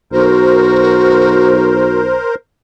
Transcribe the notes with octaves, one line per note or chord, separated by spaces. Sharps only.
B1 F#4 A#4 C5